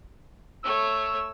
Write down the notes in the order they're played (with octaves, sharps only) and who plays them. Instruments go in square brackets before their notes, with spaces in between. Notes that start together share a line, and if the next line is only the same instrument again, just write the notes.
[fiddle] A3 C#5 [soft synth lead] E6